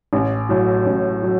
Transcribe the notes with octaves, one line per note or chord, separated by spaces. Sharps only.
A1
A2 F#3
A1
F#3